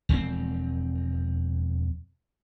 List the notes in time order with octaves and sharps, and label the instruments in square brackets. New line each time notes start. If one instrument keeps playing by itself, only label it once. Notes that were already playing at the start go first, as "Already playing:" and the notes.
[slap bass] E1 F2 F3 C4